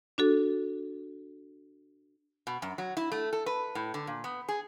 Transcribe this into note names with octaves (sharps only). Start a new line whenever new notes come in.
D4 F#4 A4
B2
F#2
F#3
E4
A3
A4
B4
A2
D3
A#2
B3
G#4